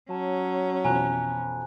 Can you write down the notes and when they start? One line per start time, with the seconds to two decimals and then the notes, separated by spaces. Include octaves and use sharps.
0.10 F#3 C#4 A5
0.85 F2 B2 E3 G#5 A#5 F#6